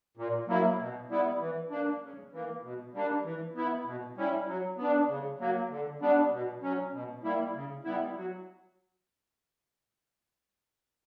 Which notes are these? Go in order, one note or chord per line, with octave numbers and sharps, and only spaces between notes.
A#2
F#3 A#3 E4
B2
G3 B3 E4
E3
A#3 D4
C#3
E3 A#3
B2
G3 A#3 D4
E3
B3 E4
B2
G3 C#4 E4
F#3
B3 D4
C#3
F#3 A#3
D3
G3 B3 D4
B2
F#3 C#4
B2
G3 A#3 E4
C#3
G3 B3 E4
F#3